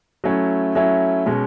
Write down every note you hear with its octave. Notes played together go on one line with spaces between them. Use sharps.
F#3 A3 C#4 E4
F#3 A3 C#4 E4
B2 G#3 C#4